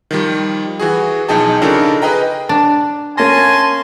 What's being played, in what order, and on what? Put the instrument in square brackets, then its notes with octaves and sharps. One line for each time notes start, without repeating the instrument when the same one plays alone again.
[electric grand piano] D#3 F3 G3
E3 F#4 G#4
B1 F3 D#4 G#4 G5 A5
C#3 D4 D#4 F4 A4 A#4
G#4 B4 D#5 G5 A#5
[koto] D4
[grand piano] A#3 C#4 A#6 [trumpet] G#5 [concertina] A5 C6